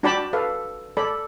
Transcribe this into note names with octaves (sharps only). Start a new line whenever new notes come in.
D4 F#4 D5 G5 A5 B5
A4 B4 F5
A4 D5 B5